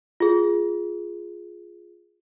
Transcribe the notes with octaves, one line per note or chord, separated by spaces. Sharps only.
F4 G#4